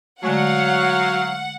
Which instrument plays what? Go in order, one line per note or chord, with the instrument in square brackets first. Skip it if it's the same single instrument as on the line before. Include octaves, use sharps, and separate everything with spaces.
[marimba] D3 G#3 A3 [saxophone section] F#3 [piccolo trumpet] F5 [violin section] F#5